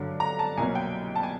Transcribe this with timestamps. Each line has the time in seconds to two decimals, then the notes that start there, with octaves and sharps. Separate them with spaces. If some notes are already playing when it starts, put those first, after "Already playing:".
Already playing: G2 D3 F#3
0.20 A#5
0.39 A5
0.57 C2 B2 F#3 A#3 G#5
0.75 G5
1.16 A5
1.23 G#5